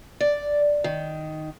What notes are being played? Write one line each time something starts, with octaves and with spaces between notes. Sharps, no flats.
D5
D#3